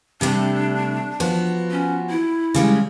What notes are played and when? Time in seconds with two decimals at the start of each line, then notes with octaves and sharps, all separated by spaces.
0.21 C3 G3 A3 D4
1.20 F3 B3 F#4
1.71 C#4
2.10 E4
2.54 C#3 G3 G#3